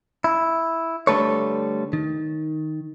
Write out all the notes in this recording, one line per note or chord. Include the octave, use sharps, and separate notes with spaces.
E4
D3 G3 A3 A4 B4 C#5
D#3